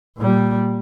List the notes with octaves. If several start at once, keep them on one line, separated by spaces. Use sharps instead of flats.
A#2 G3